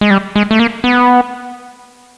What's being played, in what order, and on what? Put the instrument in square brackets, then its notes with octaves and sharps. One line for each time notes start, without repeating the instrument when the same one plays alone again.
[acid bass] G#3
G3
G#3
A3
A#3
B3